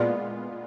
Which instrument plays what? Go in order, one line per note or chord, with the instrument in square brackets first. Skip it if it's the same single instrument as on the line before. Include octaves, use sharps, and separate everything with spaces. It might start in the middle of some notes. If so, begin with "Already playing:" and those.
Already playing: [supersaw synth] A#2 G#3 B3 F4 [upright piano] D5